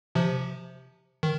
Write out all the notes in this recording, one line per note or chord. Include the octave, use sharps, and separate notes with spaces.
C3 F3
D#3